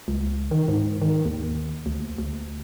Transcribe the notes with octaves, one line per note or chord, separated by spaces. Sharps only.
C#2
D#3
G#2
D#3
D#2
D2
D2